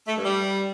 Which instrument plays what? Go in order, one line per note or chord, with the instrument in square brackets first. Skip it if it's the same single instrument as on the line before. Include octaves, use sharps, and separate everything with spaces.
[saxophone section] A3
G2
G3